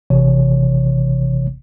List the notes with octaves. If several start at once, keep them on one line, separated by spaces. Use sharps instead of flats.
G#1 C3 E3 C#5